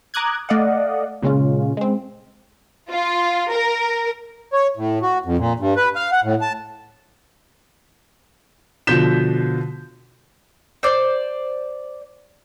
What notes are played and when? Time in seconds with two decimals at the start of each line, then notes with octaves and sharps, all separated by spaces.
0.14 A#5 D6 D#6 F#6 G#6
0.49 A3 D5 D#5 F5 F#5
1.22 A#2 C#3 G#3 C#4 F4
1.77 G#3 C4
2.89 F4
3.49 A#4
4.53 C#5
4.77 A2
5.02 F#4
5.25 F2
5.38 A#2
5.59 G2
5.76 B4
5.96 F5
6.12 F#5
6.24 A2
6.41 A5
8.87 B2 D3 F3 G6 B6 E7
10.83 C5 D5